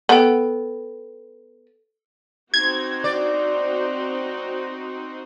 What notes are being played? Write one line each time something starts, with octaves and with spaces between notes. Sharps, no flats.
B3 A4 G5
C4 D#4 F#4 G#6
D5